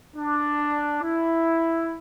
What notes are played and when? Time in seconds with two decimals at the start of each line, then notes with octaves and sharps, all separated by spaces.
0.15 D4
1.03 E4